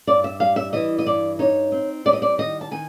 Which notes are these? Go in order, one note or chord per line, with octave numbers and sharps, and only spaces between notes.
G2 D5
E5
G3 F5
E5
E3 D#5
D#5
G2 D5
D#4 C#5
C4
G3 D5
D#5
D5
D#3 D#5
A5
D#3 G#5